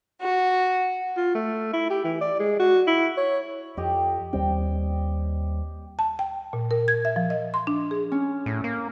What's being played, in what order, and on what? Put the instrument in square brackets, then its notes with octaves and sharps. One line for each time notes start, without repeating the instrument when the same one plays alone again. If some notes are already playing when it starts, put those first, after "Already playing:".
[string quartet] F#4
[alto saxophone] F4
A3
E4
G4
E3
D5
G#3
F#4
E4
C#5
[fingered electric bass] F2 [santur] G4 D#5
[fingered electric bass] D#2 G3 C4 [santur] G5
[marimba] A5
G5
A#2
A#4
G#6
E5
F3
D#5
C6
D4
G#4
[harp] C#4
[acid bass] A2
A#3